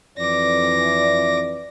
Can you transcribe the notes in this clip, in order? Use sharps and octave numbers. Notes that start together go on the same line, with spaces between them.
F2 E3 D5 D6 A#6